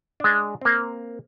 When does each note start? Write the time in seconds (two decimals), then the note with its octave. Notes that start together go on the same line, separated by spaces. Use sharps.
0.20 G#3 D4
0.61 A#3 C4